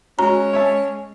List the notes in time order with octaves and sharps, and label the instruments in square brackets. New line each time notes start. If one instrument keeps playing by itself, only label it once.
[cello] G#3 [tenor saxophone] C#4 [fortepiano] F#4 [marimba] A#5
[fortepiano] C#5 E5 A5